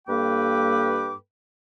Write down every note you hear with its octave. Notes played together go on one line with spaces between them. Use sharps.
G2 A#3 A4 B4 G5 D6